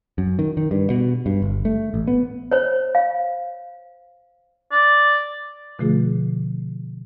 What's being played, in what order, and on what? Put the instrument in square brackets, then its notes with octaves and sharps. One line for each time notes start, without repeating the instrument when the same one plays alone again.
[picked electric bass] F#2
D#3
D#3
G2
B2
G2
G1
A3
A1
B3
[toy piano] C5 C#5
F5
[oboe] D5
[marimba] B2 D3 F3 A3 F4 G#4